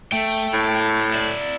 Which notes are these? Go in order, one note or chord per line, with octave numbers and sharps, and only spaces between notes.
A3 G5
A2
E4 D5